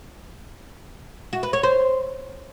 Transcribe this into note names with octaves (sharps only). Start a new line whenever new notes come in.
F#4
B4
C#5
C5